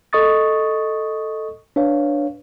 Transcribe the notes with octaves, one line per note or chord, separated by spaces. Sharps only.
A4 D#5 C#6 D#6 A6
D4 B4 C#5 F5